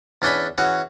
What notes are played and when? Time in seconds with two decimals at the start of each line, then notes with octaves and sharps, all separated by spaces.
0.22 E2 C#4 D4 D#5 G#5 B5
0.58 E3 C#4 F#4 G#4